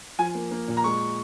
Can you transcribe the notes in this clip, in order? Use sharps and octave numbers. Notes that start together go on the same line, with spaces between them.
F3 G#5
A#3
A#3
A#2
A#5
G#3 C#6